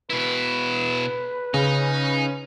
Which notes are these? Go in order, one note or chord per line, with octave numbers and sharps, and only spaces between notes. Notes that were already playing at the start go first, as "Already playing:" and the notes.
B2 E4 B4
C#3 C#4 D#4